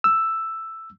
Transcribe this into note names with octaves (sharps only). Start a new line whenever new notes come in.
E6